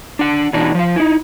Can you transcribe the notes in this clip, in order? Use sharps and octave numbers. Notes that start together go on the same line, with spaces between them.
D4 F#5
B2 E3 D4 D#4
F3 F5
D#4 E4